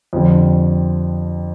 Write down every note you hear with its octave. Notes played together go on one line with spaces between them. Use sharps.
F2 D3 G3